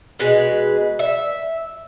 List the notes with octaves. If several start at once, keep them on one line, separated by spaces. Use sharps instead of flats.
B2 G#3 B4
E5